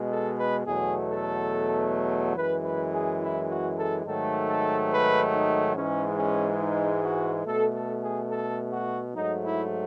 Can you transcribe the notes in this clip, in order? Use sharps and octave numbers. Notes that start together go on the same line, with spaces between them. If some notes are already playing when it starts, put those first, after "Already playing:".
Already playing: B2 G#3
A4
B4
E2 B2 F#3 A3 G#4
A4
F#2 E3 G#3 B4
B4
G#4
E4
F#4
A4
G#2 D#3 F#3 A3 A4
A4
B4
D#4
G#2 E3 G#3 C#4
C#4
D#4
F#4
B2 A3 A4
A4
G#4
A4
F#4
G#2 F#3 A3 D#4
E4